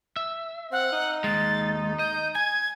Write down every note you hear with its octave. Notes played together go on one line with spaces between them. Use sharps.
E5
C4 F#5
D#4
D#2 G#3 A6
D#5 G6
G#5 G#6